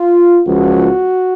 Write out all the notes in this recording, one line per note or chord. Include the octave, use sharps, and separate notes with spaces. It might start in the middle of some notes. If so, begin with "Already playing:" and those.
Already playing: F4
C#2 C#3 F3 F#4